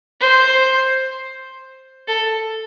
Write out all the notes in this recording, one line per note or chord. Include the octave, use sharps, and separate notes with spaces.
C5
A4